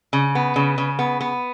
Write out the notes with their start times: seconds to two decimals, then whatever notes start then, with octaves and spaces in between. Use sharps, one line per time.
0.13 C#3
0.35 B3
0.56 C#3
0.78 C#3
0.99 B3
1.21 B3